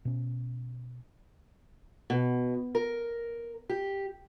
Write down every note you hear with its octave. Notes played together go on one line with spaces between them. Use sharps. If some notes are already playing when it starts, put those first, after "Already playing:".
B2 C#4
B2
A#4
G4